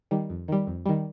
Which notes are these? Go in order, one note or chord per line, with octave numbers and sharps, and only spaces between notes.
D#3 G3
F2
D#3 G3
F2
D#3 G3